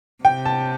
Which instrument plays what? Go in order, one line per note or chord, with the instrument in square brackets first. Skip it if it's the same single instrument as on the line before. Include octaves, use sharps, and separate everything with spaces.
[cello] C3 [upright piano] G5
[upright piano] A5